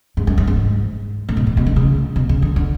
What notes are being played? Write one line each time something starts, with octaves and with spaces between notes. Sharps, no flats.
G#2
F#2
F#2
G#2
A2
B2
A2
B2
D3
C#3
B2
C#3
D3
D3